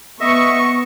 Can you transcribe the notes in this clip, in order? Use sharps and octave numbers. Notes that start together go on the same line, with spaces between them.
B3 D#5 E5 C#6